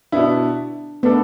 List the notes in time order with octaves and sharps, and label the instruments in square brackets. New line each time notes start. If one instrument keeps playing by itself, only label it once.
[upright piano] B2 B3 E4 [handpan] D4
[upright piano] A3 D4 A4 [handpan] B3